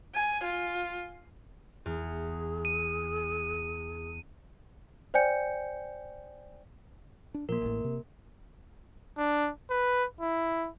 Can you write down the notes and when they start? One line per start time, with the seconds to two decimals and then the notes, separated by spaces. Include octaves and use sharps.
0.14 G#5
0.44 F4
1.86 E2 G#4
2.65 D#7
5.14 C5 D5 G5 G#5 G6 C#7
7.34 D4
7.49 A#2 F3 A#3 A#4
7.62 A1 A2
7.84 C3
9.18 D4
9.70 B4
10.21 E4